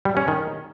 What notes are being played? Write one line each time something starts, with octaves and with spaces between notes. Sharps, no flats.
G3
C#4
D#3